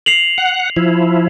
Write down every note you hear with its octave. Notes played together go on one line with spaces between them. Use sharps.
C7 F7 F#7
F#5
F3 E4